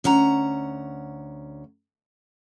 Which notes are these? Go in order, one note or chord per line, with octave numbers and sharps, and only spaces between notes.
D2 C#4 F#5 A#5